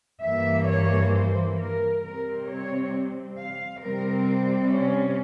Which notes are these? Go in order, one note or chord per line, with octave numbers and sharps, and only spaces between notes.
G2 E3 A#3 E5
C#5
C5
A#4
C3 G3 C4 A#4
C#5
F5
C3 G3 C4 A#4
C#4